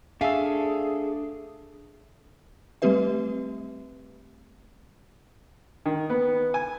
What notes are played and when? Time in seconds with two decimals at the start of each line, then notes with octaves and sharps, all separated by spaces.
0.21 A3 D4 G#4 E5 F5 G#5 E6
2.82 G3 A3 C4 G4 B4 E5
5.86 D#3
6.10 B3
6.54 G#5